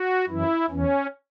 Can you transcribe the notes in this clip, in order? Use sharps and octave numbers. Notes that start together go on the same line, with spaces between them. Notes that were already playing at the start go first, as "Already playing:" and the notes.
Already playing: F#4
F#2 E3 E4
E2 E3 C#4